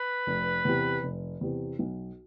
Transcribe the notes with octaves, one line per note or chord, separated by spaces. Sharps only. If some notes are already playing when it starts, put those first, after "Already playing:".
Already playing: B4
F1
E2 C3
F1
E2 C3
B1